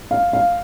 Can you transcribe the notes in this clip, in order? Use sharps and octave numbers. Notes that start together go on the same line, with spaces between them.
F5
F5